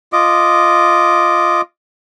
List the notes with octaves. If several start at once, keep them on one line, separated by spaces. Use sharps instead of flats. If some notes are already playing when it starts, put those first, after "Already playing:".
F4 D#5 D6